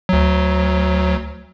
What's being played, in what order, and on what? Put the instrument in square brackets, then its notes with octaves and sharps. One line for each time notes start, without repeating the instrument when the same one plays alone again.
[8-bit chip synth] D2 F#3